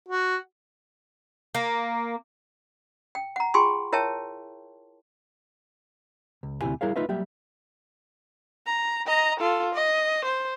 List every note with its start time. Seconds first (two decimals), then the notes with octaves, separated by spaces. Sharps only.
0.09 F#4
1.55 A#3
3.15 G5
3.36 F#5 A#5
3.54 F4 G#4 G5 G#5 C6 C#6
3.92 E4 A#4 C#5 E5 G5 A5
6.43 C#2
6.61 D2 C3 D#3 E4 G4 G#5
6.81 G3 E4 G#4 A#4 C#5 F5
6.96 A3 D#4 F4 B4 D#5 E5
7.09 F#3 G3 A#3 G4 E5
8.67 A#5
9.07 D#5 A#5
9.40 F4 A4
9.75 D#5
10.25 C5